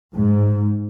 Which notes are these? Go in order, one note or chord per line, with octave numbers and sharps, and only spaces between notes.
G#2